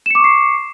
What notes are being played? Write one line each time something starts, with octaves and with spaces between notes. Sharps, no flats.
C#6 D6 C7 C#7 E7